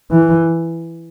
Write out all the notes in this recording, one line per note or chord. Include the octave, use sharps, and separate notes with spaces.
E3